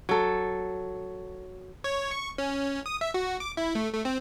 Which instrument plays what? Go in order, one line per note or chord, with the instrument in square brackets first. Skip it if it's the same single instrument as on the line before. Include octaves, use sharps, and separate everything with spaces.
[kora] F#3 A4
[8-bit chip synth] C#5
C#6
C#4
D#6
E5
F#4
D6
E4
A3
A3
C4